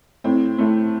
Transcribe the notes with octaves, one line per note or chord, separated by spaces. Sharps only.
A2 C4
A2 A3